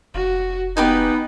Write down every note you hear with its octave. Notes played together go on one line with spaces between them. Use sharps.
F1 F#4
B3 D#4 G4 B4 G#5